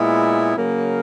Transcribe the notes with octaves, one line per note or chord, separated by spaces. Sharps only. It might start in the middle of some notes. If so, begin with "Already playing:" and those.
Already playing: A#2 G#3 B3 E4
C#3 F#3 A#3